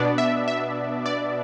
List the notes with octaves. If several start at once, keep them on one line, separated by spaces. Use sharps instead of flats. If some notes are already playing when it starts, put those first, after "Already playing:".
Already playing: B2 B3 D4 D5
E5
E5
D5